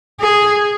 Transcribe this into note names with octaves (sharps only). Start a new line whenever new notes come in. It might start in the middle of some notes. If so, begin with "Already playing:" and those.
G#4